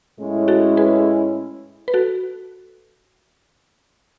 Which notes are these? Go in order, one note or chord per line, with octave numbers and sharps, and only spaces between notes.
A2 G#3 C#4 E4
F#4 A4
G#4 B4
B4
F#4 A4